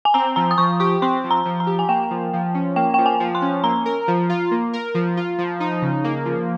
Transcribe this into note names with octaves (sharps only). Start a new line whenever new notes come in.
G#5
C4 A#5
F3 A#5
D#6
F3 C#6
G4 C#6
C4 C6
F3
A#5
F3
A#5
G4
G#5
A#3 G5
F3
F3
C#4
A#3 G5
F3 G5
G#5
F3
C6
C#4
A#3 A#5
A#4
F3
F4
A#3
A#4
F3
F4
F3
D#4
C#3
A#3
F3